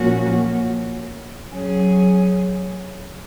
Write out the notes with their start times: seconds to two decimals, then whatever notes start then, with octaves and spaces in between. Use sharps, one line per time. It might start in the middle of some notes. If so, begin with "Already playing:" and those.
Already playing: A#2 F3 A#3 C#4 F#4
1.49 F#3 C#4 G#4